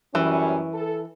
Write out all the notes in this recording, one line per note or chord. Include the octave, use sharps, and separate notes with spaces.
F#2 E3 G3 C#4
A4